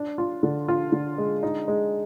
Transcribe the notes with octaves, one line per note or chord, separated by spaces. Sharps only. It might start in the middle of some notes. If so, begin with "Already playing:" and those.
Already playing: D4
F4
D3
F4
D3
G#3
D#4
G#3